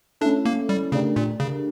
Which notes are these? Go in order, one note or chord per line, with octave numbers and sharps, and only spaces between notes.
A3 C#4 D4 E4 A4
A#3
G3
C#3 A3 D4 G4 A#4
A#2
C#3